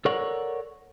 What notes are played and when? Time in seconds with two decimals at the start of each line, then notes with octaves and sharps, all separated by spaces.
0.05 A4 A#4 C#5 D5 F#5